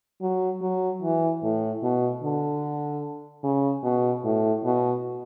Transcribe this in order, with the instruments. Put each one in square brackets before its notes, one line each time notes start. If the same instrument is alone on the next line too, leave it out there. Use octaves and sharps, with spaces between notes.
[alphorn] F#3
F#3
E3
A2
B2
D3
C#3
B2
A2
B2